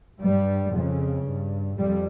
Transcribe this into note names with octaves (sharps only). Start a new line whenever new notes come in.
G2 G3
F2 C#3
G2
F2 G3